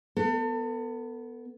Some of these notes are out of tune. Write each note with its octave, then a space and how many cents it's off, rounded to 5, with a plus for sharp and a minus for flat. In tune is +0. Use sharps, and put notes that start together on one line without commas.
B3 +0 A4 +35